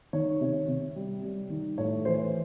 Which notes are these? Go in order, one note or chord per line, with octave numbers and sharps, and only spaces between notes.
D#3 C#5
C3
C3
G3
G3
D#3
A2 C#5
E3 C5